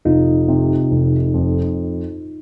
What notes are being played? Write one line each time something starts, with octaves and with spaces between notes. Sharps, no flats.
F1 D#4 F4
C3
F1
F2